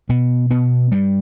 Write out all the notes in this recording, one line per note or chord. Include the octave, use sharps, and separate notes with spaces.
B2 B3
B2 B3
G2 G3